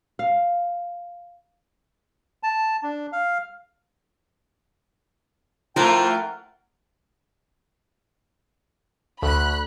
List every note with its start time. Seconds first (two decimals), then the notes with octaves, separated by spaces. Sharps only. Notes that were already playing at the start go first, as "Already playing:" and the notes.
0.19 F5
2.43 A5
2.83 D4
3.12 F5
5.76 F3 A3 E4 F4 A#4 F#5 G5
9.22 D2 B5 F#6